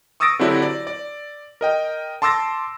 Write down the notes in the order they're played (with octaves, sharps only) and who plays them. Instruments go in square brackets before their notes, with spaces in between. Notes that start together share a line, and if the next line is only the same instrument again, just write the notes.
[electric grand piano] C#6 D#6 E6 A6 A#6 D7
D3 F#3 C4 D4 E4 G4
D5
D5
A#4 D#5 G5
A5 C6 D6 E6 A6 A#6